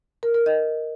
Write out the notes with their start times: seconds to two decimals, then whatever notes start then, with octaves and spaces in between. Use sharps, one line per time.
0.23 A#4
0.35 A#4
0.46 D#5